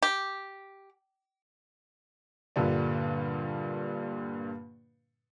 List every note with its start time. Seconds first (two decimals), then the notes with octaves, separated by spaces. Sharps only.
0.02 G4
2.56 G2 A#2 D3 G3 D4